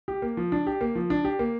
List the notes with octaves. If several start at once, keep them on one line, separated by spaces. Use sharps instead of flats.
G4
A#3
F3
D4
G4
A#3
F3
D4
G4
A#3